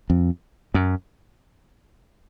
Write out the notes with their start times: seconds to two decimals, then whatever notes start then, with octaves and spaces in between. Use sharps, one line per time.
0.10 F2
0.74 F#2